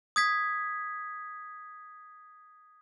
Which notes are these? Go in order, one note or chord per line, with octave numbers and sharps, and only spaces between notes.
D#6 G#6 B6